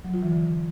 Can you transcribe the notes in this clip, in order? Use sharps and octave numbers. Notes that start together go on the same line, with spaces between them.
F#3
F4
E3
D3